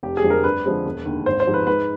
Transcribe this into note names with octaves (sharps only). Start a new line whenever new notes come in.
F1 G4
G#4
F2 D3 F3 G#3
A#4
G2 B4
D3 F3 G#3 C4
E1
D#2 D3
G#1 C5
C5
G#2 F3 G#3
B4
G#2 B4